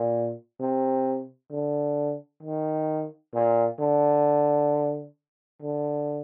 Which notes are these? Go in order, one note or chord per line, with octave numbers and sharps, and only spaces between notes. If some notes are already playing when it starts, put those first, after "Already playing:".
Already playing: A#2
C3
D3
D#3
A#2
D3
D3